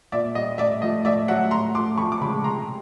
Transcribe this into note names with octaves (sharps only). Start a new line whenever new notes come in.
A#2 D5 E5
G3 D#5
A2 D5 E5
F3 A3 D#5
A2 D5 E5
F#3 A3 E5 F#5
A2 A#5 C6
F3 A3 C6 D6
F2 B5 C#6
D6
C#3 F3 G#3 B5 C#6
C3 A#5 C6